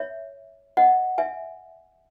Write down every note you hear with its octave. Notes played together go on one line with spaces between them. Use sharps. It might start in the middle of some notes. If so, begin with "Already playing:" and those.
Already playing: C#5 E5
D#5 F#5
E5 G#5